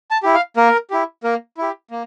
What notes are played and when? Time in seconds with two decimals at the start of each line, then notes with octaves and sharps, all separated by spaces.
0.11 A5
0.23 E4 G4
0.34 F5
0.57 A#3 A#4
0.91 E4 G4
1.24 A#3 A#4
1.58 E4 G4
1.91 A#3